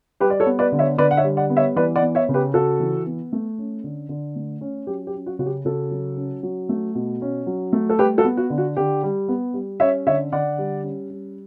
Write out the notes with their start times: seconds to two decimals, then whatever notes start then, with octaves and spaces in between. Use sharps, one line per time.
0.20 G3 G4 B4
0.30 D5
0.40 A4 C#5
0.46 B3
0.59 B4 D5
0.72 D3
0.79 C#5 E5
0.98 D3 B4 D5
1.11 F#5
1.17 C#5 E5
1.24 G3
1.37 D5 F#5
1.50 B3
1.57 C#5 E5
1.76 E3 B4 D5
1.96 D5 F#5
2.02 B3
2.15 C#5 E5
2.29 C#3
2.34 G4 B4
2.54 C#3 F#4 A4
2.80 E3
3.06 B3
3.32 A3
3.58 C#4
3.84 D3
4.09 D3
4.36 A3
4.61 C#4
4.87 F#3 G4
5.07 G4
5.14 C#4
5.26 F#4
5.39 C#3 F#4
5.46 G4
5.65 C#3 F#4 A4
5.91 F#3
6.17 C#4
6.43 F#3
6.69 A3
6.95 B2
7.22 C#4
7.46 F#3
7.73 A3
7.90 A4
7.99 G3 G4 B4
8.18 F#4 A4
8.25 B3
8.37 F#4
8.50 D3
8.58 F#4
8.77 D3 G4
9.03 G3
9.28 B3
9.54 G3
9.80 C#4 C#5 E5
10.07 D3 C#5 E5
10.32 D3 D5 F#5
10.58 G3
10.84 C#4
11.10 G3